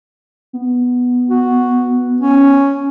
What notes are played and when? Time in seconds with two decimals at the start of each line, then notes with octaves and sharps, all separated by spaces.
0.53 B3
1.29 F#4
2.21 C#4